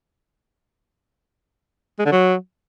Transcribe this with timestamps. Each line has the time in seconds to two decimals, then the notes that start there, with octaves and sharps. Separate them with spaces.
1.99 G#3
2.06 D3
2.12 F#3